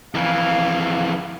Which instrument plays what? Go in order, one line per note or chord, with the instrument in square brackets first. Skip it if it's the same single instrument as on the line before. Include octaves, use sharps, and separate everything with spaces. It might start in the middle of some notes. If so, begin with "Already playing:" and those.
[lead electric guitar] F2 E3 [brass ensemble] F5